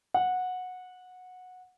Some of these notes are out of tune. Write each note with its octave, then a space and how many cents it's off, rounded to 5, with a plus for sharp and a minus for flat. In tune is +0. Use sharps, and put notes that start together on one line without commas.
F#5 -15